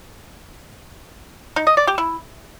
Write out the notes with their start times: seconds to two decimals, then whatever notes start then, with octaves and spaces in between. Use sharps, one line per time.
1.56 D#4
1.67 D#5
1.77 D5
1.87 G4
1.98 E4